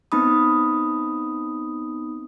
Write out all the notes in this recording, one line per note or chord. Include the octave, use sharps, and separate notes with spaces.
B3 C4 D#4 B5 D#6